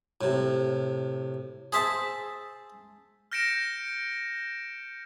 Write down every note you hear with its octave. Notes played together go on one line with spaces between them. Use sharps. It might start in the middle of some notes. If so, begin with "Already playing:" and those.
A2 C3
G#4 C5 E5 A5
F6 G6 A#6 C#7 D7 E7